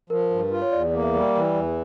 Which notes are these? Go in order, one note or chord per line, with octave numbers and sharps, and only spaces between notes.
F3 A#4
G2
F4
C#5
E2 D5
A#3
E5
G3
E3
E2